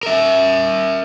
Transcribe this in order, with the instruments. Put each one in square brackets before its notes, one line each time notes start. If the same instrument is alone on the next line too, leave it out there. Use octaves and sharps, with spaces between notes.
[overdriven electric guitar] A#4 E5